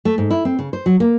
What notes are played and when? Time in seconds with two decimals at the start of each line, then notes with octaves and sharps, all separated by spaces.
0.05 A3
0.18 G#2
0.30 E4
0.45 C4
0.59 C#3
0.73 C5
0.86 F#3
1.00 A#3